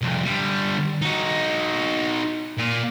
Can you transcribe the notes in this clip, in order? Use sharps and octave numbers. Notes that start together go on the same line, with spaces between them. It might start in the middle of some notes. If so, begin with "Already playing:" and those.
C2 F2
D3 G3
D#4 F#4
A#2